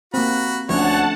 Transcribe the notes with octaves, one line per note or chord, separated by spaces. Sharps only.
A#3 C4 F#4 B5
D2 F3 C#4 C#5 F#5 A5